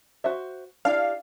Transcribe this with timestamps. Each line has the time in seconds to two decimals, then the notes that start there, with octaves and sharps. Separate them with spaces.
0.24 F#4 C5 E5
0.85 D4 E4 G4 F5